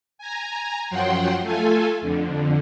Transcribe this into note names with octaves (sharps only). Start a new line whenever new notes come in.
G#5 A#5
F#2 F3 F#3 F#5 G5 C6
A3 F4 A4 G#5
F2 D3